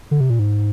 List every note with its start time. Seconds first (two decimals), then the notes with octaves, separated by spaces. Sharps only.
0.11 D3
0.20 C3
0.30 A#2
0.39 G#2